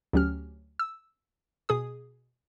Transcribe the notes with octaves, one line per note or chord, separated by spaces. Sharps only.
D2 F#3 C#4 G4 F6
E6
B2 G#4 D#6